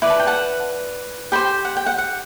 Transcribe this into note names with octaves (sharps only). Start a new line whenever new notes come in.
E4 B4 D5 B5
A5
G5
F#5 A5
G4 C5 G5 B5
F#5
G5
F#5
F#5